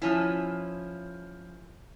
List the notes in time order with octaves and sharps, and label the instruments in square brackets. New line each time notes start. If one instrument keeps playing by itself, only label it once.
[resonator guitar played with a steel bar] F3 C#4 E4